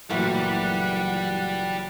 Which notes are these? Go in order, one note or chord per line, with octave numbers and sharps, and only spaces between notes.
F#1 A#2 E3 G3 A3 F4 F#4 F#5